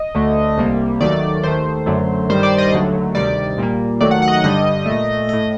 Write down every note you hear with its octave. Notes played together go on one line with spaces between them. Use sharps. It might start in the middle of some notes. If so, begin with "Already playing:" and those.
Already playing: D#5
D2 D3 A3
C2 C3 G3 A#3
D#2 D#3 F#3 A3 D5
D#2 D#3 A3 C5
F#2 D3 F#3 A3
G2 D#3 G3 C5
D5
D#5
D#2 D3 F#3 A3
D2 C3 D#3 G3 D5
A#2 G3 A#3
D#2 D#3 F#3 A3 D5
F#5
F#5
D#5
F#5
G2 D3 G3 D#5
A#2 A3
A2 A3 D#5